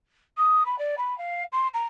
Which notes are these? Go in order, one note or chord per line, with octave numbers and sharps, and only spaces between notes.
D#6
B5
D5
B5
F5
C6
A#5